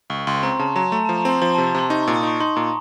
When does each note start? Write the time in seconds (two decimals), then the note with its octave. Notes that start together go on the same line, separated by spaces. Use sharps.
0.10 C#2 C#6
0.27 C#2 C6
0.43 C4 A#5
0.59 C#3 A5
0.76 F#3 A#5
0.92 A3 A#5
1.05 F3 A5
1.18 A#5
1.25 C4 C6
1.42 F3 C6
1.54 C3 A5
1.67 A#5
1.75 C3 C6
1.86 C6
1.90 D#4 C#6
2.03 A#2 C#6
2.16 D#6
2.23 D#4 C#6
2.40 D#4 C6
2.56 A#2 A#5